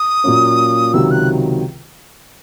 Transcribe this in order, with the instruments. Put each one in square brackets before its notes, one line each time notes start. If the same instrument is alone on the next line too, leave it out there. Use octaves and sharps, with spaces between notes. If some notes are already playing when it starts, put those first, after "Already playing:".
Already playing: [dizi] D#6
[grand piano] A#2 F#3 A#3 C#4
[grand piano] C#2 C3 D#3 F#3 [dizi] E6
[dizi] F#6